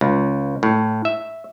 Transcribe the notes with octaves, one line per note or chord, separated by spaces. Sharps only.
C#2
A2
E5